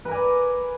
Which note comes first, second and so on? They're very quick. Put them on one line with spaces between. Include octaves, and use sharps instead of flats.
B4 A#4 G#5 D5